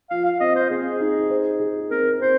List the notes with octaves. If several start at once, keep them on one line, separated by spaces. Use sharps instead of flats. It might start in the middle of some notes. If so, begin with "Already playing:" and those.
F3 F5
F5
C4 D#5
C5
C4 G#4
D#4
C5
G#4
C4 A#4
C4 C5